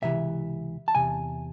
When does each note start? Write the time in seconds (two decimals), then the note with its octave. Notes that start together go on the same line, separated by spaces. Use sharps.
0.02 C#2 C3 E3 E5
0.88 A5
0.95 E2 C3 G#5